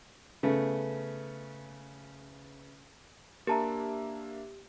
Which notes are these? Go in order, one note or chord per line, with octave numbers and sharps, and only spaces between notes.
C#3 A3 B3
A#3 D4 G4 A#4 E5 A5 A#5